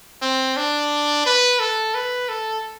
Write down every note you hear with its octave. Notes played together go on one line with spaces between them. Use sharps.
C4
D4
B4
A4
B4
A4